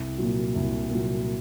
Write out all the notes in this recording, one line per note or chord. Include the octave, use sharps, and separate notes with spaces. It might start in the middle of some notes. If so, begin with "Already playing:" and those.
Already playing: C2
A#2 F#3
C2
A#2 F#3